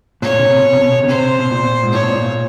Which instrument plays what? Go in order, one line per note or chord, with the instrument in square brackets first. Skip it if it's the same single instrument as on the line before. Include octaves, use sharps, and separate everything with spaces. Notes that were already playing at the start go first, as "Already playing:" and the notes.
[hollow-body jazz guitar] A#2 [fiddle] C#5
[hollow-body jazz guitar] C#3
C3
B2
C3
B2
C#3
[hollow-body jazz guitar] C3 [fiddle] C5
[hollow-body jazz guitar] B2
A#2
G#2
[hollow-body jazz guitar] A2 [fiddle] C#5
[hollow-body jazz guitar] B2
A#2
A#2